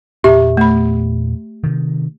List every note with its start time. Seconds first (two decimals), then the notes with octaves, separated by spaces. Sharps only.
0.24 E2 A#2 B3 G4 E5
0.57 A3 B5
1.64 C3 D#3